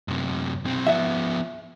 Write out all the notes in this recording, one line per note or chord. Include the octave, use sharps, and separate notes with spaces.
F#2 C3
B1 C4
F3 B3 E5